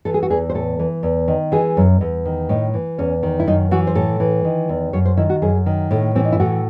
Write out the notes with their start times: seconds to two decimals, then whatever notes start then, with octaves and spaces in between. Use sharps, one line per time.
0.05 E3 A4
0.14 G#4
0.23 F#4
0.30 E2 G#4
0.50 C5
0.55 A2 A4
0.79 E3
1.03 E2
1.28 D#3
1.52 E3 G#4
1.77 F#2
2.01 E2
2.25 D#3
2.49 A2 D#4
2.74 E3
2.98 E2 C#4
3.23 D#3
3.40 E4
3.47 F#2 D#4
3.71 E3 F#4
3.87 C5
3.95 A2 A4
4.20 E3
4.45 D#3
4.69 E2
4.93 F#2 C#5
5.06 C5
5.17 D#3 E4
5.30 F#4
5.42 F#2 G#4
5.66 D#3
5.91 A2 A3
6.15 E3 C4
6.25 D#4
6.32 E4
6.40 A2 F#4